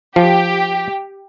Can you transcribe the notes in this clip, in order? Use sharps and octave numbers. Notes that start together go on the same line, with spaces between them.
F3 G4